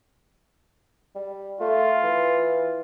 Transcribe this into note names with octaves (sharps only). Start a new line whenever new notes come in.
G3
A3 F4
E3